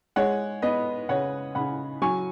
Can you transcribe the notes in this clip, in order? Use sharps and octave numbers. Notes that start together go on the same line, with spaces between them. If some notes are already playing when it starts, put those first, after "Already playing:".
G#3 C#5 F#5
B3 B4 D#5
C#3 C#5 F#5
C#3 F#5 B5
F#3 G#5 C#6